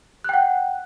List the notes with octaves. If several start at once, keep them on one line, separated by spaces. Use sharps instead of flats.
F#5 G5 F#6